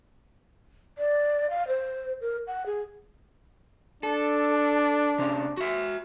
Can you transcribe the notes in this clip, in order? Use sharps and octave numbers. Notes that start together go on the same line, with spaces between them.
D5
F5
C5
A#4
F#5
G#4
D4 A4
C3 C#4
F#4 E5